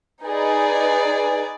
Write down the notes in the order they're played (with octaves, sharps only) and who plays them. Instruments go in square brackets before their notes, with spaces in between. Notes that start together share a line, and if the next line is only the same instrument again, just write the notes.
[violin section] D#4 G#4 B4 D5